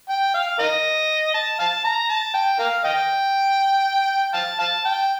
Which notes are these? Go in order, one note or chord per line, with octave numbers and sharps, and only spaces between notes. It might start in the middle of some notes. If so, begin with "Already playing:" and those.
G5
F5
A#4 D#5
A5
F5 A5
A#5
A5
G5
A#4 F5
D#5 G5
F5 A5
F5 A5
G5